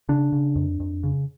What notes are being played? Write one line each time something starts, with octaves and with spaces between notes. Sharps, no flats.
C#3 D4
C#3
F2
F2
C#3